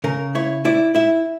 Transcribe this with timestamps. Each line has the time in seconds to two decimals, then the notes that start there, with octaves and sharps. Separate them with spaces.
0.04 C#3 A#4
0.35 E4 C#5
0.65 E4 D5
0.95 E4 E5